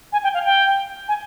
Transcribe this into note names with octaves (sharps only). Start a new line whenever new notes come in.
G#5
G5
F5
G5
G#5